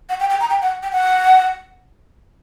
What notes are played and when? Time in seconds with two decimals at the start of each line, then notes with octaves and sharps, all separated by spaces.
0.09 F#5
0.20 G5
0.30 G5
0.40 A#5
0.50 G5
0.62 F#5
0.83 G5
0.92 F#5